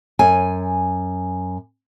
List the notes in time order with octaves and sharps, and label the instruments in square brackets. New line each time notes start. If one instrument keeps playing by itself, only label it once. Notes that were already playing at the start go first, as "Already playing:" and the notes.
[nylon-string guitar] F#2 G#5